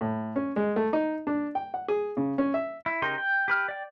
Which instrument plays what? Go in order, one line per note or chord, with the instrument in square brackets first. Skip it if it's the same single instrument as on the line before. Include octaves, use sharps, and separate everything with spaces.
[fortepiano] A2
C#4
G#3
A3
D#4
D4
G5
F#5
G#4
C#3
C#4
E5
[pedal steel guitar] E4
C#3 D#4 G4 A#4 C6
G5
G4 B4 F6
D5 G5